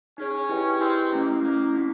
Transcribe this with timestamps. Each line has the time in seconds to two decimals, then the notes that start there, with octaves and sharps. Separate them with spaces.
0.17 C#4 D#4 G#4 C#5
0.49 E4 G4 B4 D#5 G5
0.80 C4 E4 G4 B4 D#5 G5
1.11 A3 A#3 C#4 E4
1.41 A3 A#3 C#4 E4
1.73 C4 D#4 F#4